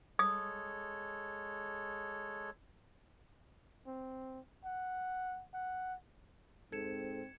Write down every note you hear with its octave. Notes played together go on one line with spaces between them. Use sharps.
G#3 A4 C#5 D#6
C4
F#5
F#5
G#2 C4 A4 G#6 C#7 E7